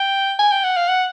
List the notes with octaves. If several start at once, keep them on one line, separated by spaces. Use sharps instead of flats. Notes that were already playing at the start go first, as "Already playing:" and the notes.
Already playing: G5
G#5
G5
F#5
F5
F#5